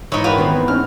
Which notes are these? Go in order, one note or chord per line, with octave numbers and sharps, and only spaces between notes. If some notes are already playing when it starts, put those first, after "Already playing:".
G#2 E3 E4 C#5 D#5
F4 F#4 A#4 B4 C#5 G5
D#3 E3 B3 C5
C4
C4 C#4 D#4 F6